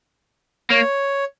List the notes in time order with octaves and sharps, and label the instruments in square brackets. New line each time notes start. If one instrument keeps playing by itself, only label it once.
[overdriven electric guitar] A#3 [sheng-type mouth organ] C#5